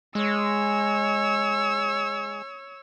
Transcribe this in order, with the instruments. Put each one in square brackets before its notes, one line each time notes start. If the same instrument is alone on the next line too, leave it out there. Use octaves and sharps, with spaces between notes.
[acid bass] G#3 [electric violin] C#5 E6